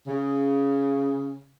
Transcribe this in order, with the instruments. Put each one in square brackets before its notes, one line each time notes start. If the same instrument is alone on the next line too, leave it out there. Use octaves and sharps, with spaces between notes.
[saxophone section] C#3